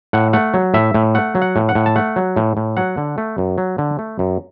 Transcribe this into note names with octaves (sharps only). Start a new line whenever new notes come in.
A2 F#5
A3 F#5
F#3
A2 E5
A2
A3 F#5
F#3
F#5
A2
F#5
A2
A5
A3 F#5
F#3
A2
A2
F#3 F#5
D3
A3
F#2
F#3
D3
A3
F#2